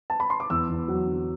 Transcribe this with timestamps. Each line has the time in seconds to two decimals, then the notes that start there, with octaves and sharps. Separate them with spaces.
0.10 A5
0.20 B5
0.30 C6
0.40 D6
0.50 E2 E6
0.69 E2
0.88 F#3
1.07 D3